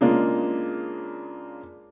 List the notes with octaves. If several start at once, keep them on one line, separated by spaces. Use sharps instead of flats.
C#3 G#3 A#3 D4 F4